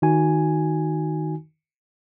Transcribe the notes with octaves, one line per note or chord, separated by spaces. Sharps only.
D#3 D#4 F#4 G#5